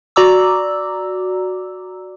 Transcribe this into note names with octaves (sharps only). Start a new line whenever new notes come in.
F#4 D5 A#5 D6 E6